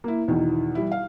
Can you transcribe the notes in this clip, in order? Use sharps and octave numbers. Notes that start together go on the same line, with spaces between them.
A#3 E4
E2 B2 D#3
E3 G3 E4
F5